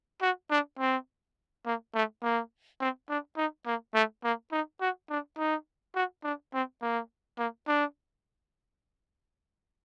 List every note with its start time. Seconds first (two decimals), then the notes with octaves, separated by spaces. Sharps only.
0.22 F#4
0.51 D4
0.79 C4
1.66 A#3
1.95 A3
2.23 A#3
2.80 C4
3.09 D4
3.37 D#4
3.66 A#3
3.94 A3
4.24 A#3
4.52 D#4
4.81 F#4
5.10 D4
5.38 D#4
5.95 F#4
6.24 D4
6.54 C4
6.82 A#3
7.39 A#3
7.67 D4